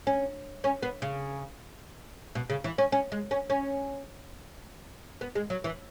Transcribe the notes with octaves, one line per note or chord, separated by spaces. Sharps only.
C#4
C#4
B3
C#3
B2
C#3
E3
C#4
C#4
G#3
C#4
C#4
B3
G#3
F#3
E3